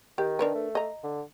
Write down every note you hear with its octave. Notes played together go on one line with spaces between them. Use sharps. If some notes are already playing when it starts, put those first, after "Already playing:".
D#3 G4
D4 A#4 B4
A3
D#5 A#5
D3